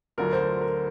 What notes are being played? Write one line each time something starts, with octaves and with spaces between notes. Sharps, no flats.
D2 D3 F#3 A#4
C5
A#4